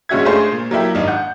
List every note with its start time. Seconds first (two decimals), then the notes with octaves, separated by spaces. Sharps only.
0.09 G2 G#3 C#4 F#4 E5 G#6
0.25 G#3 A3 D4 F4 G#4 C5
0.52 A#2
0.71 F#3 A#3 E4 G4
0.95 G#1 D4 D#4
1.07 F#5 G6